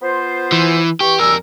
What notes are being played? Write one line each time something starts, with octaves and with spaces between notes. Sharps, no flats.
B3 F4 C5
E3
E3 G4 C#6
F2 G3 A#4 G#5 E6